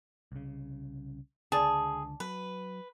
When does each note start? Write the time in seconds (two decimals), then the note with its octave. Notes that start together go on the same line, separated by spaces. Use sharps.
0.32 C2 C#3
1.52 C#2 D3 G#4 D5 A5
2.20 F#3 B4